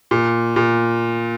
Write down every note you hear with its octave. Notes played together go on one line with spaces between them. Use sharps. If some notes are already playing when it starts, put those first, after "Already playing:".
A#2
A#2